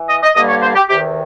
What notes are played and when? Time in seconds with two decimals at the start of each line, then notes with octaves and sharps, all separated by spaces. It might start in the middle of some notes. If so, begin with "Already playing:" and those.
Already playing: E3
0.09 D#5
0.23 D#5
0.35 G2 D3 G3 A#3 D#5
0.48 C#5
0.62 C5
0.75 G4
0.88 E2 C3 D#3 G4